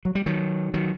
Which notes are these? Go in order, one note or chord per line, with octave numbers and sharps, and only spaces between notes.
F#3
G3
D#3 F#3
D#3 F#3